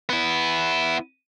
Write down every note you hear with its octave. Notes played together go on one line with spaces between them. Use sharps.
B3 E4